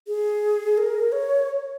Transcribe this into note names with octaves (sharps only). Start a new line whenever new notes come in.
G#4
A#4
C#5